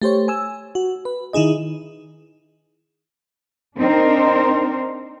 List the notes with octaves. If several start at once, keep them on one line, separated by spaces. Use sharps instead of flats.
A3 G4 C5 C#5
G#5 E6
F#4
B4
D#3 D#4 E4 G#4 D#5
C4 D4 D#4 A#4 C5